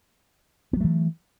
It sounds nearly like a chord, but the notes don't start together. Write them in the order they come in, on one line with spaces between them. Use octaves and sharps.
B3 F#3 A3 E3